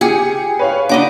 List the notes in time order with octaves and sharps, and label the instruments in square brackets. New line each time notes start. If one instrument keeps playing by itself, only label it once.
[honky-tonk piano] G4 C#7 [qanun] G#4
[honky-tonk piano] B4 C#5 F5
[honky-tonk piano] D4 F#5 B5 [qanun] D#4 D#5 D6